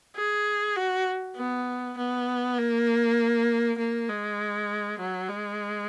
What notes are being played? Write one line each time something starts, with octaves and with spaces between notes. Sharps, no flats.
G#4
F#4
B3
B3
A#3
A#3
G#3
F#3
G#3